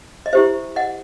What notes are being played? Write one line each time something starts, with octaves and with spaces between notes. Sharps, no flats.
D#5
E4 G4 C5 E5
D#5 F#5